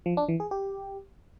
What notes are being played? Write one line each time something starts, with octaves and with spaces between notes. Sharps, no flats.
F3
D4
E3
G#4
G4